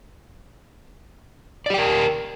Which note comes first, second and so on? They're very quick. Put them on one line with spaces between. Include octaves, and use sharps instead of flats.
D5 G4 G5 A#4